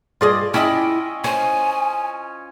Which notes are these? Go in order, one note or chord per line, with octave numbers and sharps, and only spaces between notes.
G2 F4 G#4 D5 D#5
C#4 E4 D#5 G5
C5 C#5 G#5